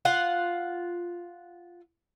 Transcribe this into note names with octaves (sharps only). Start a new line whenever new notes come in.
F4 F5 F#5